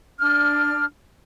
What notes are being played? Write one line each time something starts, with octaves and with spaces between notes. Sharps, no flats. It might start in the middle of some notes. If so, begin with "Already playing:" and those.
D4 F6